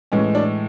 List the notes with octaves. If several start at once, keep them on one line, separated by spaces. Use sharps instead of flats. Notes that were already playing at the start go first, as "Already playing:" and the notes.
A2 E3 G#3 C#4
D4